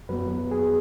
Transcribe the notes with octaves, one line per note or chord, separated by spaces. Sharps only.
F#2 F#3 B3 B4
G#4